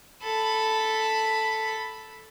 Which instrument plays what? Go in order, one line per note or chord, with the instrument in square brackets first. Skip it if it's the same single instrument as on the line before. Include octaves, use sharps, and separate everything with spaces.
[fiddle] A4 B5